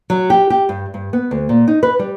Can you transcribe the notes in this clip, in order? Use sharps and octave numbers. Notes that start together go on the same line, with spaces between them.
F#3
G4
G4
G2
G2
B3
D2
A#2
D#4
B4
G3